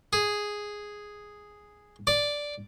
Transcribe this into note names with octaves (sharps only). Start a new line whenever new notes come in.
G#4
D5